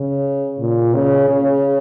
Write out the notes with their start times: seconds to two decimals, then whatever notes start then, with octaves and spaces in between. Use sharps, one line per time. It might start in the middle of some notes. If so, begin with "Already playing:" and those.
Already playing: C#3
0.59 A#2
0.94 C#3
1.29 C#3